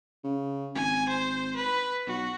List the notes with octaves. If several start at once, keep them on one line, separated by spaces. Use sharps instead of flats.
C#3
G#1 G#5
C5
B4
B1 F#4